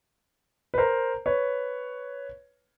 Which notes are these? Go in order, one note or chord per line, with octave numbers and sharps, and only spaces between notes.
B4
A#4 C5
B4 C#5